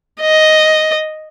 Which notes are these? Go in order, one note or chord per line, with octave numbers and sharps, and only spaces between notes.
D#5